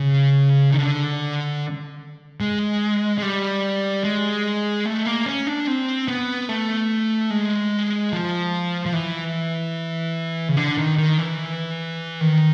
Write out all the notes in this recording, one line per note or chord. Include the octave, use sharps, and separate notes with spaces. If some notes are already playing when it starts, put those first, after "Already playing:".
Already playing: C#3
D#3
D3
G#3
G#3
G3
G#3
A3
A#3
C#4
D4
C4
B3
A3
G#3
F3
F3
E3
C#3
D3
D#3
D#3
E3
D#3